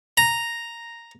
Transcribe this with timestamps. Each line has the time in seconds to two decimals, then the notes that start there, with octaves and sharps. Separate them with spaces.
0.17 A#5